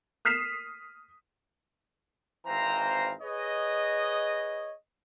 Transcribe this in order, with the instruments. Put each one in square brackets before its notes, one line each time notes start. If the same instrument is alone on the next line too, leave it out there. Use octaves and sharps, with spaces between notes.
[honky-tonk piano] D#6 F6 B6 C7 E7
[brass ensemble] G#1 E3 C4 C5 F5 A#5
G#4 B4 C#5 D#5